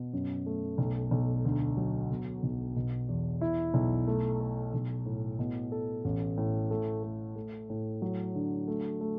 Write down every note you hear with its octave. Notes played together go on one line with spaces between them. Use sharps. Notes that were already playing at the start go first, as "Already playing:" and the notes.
Already playing: B2
F#2
A3
B1
B1
D2
F#3
B2
B1
B2
E2
E4
B1
A3
A4
B1
A2
B2
A4
A1
A2
A3
A3
A3
A2
F#3
D3
A3
A3